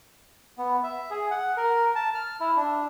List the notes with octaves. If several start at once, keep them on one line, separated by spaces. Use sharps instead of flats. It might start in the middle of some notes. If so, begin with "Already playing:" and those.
B3
E5
G#4
F#5
A#4
A5
F6
E4
D4